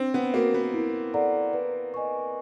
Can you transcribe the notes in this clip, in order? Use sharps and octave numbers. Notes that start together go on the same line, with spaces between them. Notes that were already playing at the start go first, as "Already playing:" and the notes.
Already playing: C4 D4
B3
A#3 F#4 A#4
B3
E4
A4 D5 F#5 A#5
B4
D#5 G#5 C#6